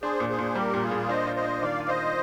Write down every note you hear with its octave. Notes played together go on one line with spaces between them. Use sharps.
D4 G#4 C5
A#2
G#4 C5
A#2
G3 G4 A#4
A#2
F4 G#4
A#2
D4 C5 D#5
F4
C5 D#5
D4
D#3 D5 F5
F4
C5 D#5
F4